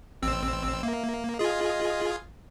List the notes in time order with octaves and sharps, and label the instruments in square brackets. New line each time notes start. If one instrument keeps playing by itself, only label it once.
[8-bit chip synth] A1 C4 E6
[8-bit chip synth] A#3 [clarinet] E5
[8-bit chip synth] F4 G#4 [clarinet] D#5